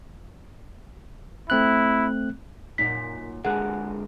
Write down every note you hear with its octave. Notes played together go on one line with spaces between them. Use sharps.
A3 C4 E4 F#6
F#2 A#2 D#4 B6
D3 G#3 G#4 A#4 F#5 F#6